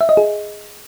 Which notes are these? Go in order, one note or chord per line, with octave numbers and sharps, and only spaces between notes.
E5
D#5
G#4